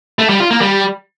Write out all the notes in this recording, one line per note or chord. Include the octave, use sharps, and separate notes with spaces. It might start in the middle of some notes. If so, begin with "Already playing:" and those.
A3
G3
F4
A#3
G3